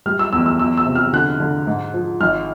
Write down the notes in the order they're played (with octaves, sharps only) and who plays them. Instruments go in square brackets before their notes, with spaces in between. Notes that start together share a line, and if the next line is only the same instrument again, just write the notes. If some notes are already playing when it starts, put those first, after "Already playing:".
[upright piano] G3 F6
E6
E2 E6
E6
E2 E6
E6
C3
F6
D3 F#6
D3
G#2
F3
G#1 F6